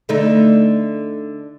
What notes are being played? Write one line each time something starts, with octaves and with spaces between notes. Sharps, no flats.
D3 A3 D#4